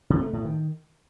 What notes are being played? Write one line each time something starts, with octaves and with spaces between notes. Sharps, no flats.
C3
A3
A2
D#3